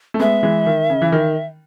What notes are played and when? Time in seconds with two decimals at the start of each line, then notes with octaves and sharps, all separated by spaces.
0.14 A3
0.19 G#3 B3 E5
0.43 E3 G#3
0.66 D#3
0.90 C#3
1.02 E3
1.12 D#3